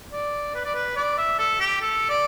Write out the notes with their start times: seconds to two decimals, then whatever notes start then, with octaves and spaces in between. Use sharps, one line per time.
0.13 D5
0.55 B4
0.65 D5
0.75 B4
0.96 D5
1.18 E5
1.39 A4
1.60 G4
1.81 A4
2.09 D5